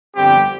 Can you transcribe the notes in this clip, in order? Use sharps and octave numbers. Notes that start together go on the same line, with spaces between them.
G1 F2 D3 G3 C4 G4 G5